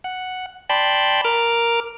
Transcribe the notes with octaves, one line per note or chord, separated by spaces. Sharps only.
F#5
D5 G5 A5 B5 C6
A#4 D6 F6